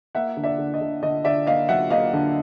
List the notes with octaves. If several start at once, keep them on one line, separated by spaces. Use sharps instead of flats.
A#3 E5 F#5
D3
D5 E5
D3
D#5
D3
D3 D#5
D3 D5 E5
A#3 D#5 F5
F#3 E5 F#5
A#3 D#5 F5
D3